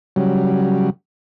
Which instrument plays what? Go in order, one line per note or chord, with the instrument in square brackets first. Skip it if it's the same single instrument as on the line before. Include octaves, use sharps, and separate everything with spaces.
[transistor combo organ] C#3 F#3 G3